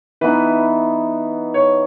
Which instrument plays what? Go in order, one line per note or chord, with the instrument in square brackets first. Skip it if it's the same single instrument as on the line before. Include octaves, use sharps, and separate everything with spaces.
[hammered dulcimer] E3 B3 D#4 [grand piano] B4
[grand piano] C#5